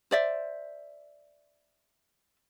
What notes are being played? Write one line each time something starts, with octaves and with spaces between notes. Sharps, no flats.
C5 D5 E5